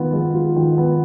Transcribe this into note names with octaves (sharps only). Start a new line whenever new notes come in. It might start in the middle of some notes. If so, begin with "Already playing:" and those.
Already playing: D#3 G#3 B3 F4
G#3
F4
D#3
B3